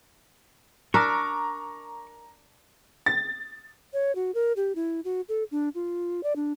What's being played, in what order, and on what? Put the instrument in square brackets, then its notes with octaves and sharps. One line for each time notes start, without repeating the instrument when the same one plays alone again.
[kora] D4 A#4 E5 [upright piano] A#5 [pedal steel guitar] C#6 D6
[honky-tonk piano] A6
[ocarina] C#5
F#4
A#4
G4
E4
F#4
A4
D4
F4
D5
D4